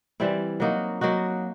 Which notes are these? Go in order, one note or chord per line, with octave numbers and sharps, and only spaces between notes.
E3 G3 C4 E4
F#3 A#3 D#4 F#4
F#3 A#3 D#4 F#4